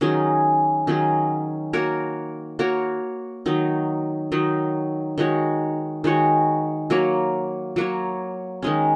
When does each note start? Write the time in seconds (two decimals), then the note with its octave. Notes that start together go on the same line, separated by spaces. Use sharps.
0.01 D#3 F#3 C#4 G#4
0.87 D#3 F#3 C#4 G#4
1.73 A#3 F#4 A#4 C#5
2.59 A#3 F#4 A#4 C#5
3.46 D#3 F#3 D#4
4.32 D#3 F#3 D#4
5.18 D#3 G#3 F#4 C#5
6.04 D#3 G#3 F#4 C#5
6.90 F#3 A#3 F#4 C#5
7.76 F#3 A#3 F#4 C#5
8.63 D#3 G#3 C#4